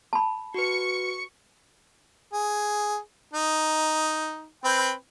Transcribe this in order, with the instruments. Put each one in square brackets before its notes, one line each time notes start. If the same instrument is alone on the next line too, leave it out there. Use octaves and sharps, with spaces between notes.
[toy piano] A5 B5
[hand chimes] F#4 B4 [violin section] C#6 C#7
[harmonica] G#4
D#4
C4 B4 G5